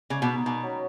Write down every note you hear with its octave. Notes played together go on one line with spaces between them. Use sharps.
C#3 G#3
B2
D#4 G#4
B2 D#3
F#3 C#4